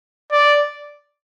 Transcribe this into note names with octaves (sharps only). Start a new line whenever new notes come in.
D5